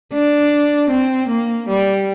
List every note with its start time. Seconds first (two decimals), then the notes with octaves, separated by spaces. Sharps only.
0.13 D4
0.90 C4
1.29 A#3
1.68 G3